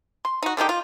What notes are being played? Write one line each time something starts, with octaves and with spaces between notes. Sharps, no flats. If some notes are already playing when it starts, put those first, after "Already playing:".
C6
D#4 F#4
D3 D#3 D#4 G4
F4